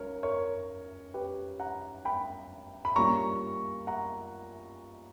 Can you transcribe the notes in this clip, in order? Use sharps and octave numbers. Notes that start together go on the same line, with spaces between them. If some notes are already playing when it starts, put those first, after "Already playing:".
Already playing: C#2 A#4 C#5
A#4 C#5
G4 B4
F#5 A#5
G5 B5
B5
A#2 G3 A#3 C#4 A#5 C#6
F#5 A#5